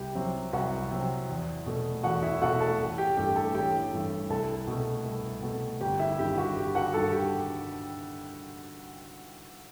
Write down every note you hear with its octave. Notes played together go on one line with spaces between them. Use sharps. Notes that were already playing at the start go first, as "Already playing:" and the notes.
Already playing: C2 G4 G5
C3 F#3 C4
C2 F#4 F#5
C3 F#3 C4
E2
B2 A3
E2 F#4 F#5
E4 E5
B2 A3 F#4 F#5
A4 A5
A1
G4 G5
G2 E3 A3 G4 G5
A4 A5
A1 G4 G5
G2 E3 A3
C2 A4 A5
B2 A3
C2
B2 A3
G1 G4 G5
E4 E5
G2 D#3 G4
F#4
G1 G4
F#4 F#5
G2 D#3 A4 A5
G4 G5